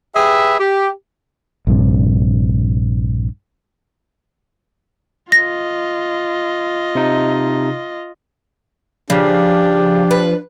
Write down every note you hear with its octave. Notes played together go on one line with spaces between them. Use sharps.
G4 G#4 B4 E5
G4
A#1 G2 C3
F4 D#5 A#6
C3 D#4
C#3 F3 D4 G4
B4